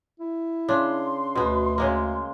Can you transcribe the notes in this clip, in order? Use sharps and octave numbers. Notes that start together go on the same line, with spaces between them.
E4
C#3 D4 C6
D2 B2 B3
C#3 G#3 A#3